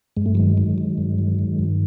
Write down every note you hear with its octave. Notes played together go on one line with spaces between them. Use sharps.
G2 G#3
A3
D#3 F#3 G#3
D#3
D#3
G2
D#3
D#3
G2